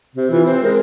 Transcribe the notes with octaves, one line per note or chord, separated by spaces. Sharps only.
C3
E3 F4
C4 C5
G#3 A#4